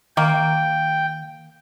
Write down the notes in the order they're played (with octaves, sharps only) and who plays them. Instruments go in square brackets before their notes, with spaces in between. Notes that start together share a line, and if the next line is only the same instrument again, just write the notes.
[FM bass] D#3 [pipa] A#3 [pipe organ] G5